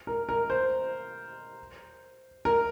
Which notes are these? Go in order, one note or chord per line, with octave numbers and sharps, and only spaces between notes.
A#4
A#4
C5
A#4